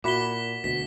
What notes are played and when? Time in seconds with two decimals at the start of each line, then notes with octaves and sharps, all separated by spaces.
0.04 A#2 E4 F#4 B5 D6 B6 G7
0.64 D2 B2 B6